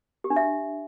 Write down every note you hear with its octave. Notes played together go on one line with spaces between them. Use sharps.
G4
D4
E5